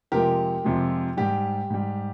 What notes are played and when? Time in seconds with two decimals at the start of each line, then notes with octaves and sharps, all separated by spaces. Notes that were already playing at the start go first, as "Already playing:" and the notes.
0.12 F2 C3 F3 G#3 G4 A#4
0.64 F2 C3 F3 G#3
1.17 G#2 G3 G4
1.70 G#2 G3